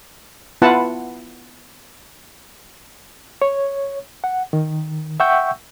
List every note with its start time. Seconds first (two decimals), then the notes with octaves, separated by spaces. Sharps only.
0.62 B3 E4 F4 B4 F#5 A5
3.42 C#5
4.24 F#5
4.53 D#3
5.20 E5 F#5 G5 C#6 E6 G6